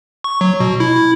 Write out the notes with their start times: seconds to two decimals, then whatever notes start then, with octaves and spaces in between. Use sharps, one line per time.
0.24 C#6
0.41 F#3
0.60 B2
0.80 E4
0.96 E4